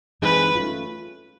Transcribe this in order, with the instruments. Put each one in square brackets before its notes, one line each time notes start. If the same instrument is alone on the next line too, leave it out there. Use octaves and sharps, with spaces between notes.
[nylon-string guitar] E3 G#3 C4 D#4 G#4 [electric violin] B4
[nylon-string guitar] A3 C#4 F4